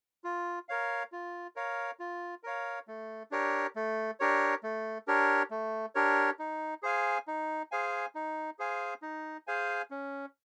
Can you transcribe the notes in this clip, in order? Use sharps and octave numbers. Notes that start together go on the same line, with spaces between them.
F4
A#4 C#5 F5
F4
A#4 C#5 F5
F4
A#4 C#5 F5
A3
D4 G4 A#4 C#5
A3
D4 G4 A#4 C#5
A3
D4 G4 A#4 C#5
A3
D4 G4 A#4 C#5
D#4
G#4 C5 F5 G#5
D#4
G#4 C5 F5 G#5
D#4
G#4 C5 F5 G#5
D#4
G#4 C5 F5 G#5
C#4